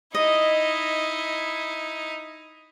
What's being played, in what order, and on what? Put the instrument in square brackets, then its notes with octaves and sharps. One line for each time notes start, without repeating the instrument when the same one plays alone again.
[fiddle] D#4 E4 [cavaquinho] D#5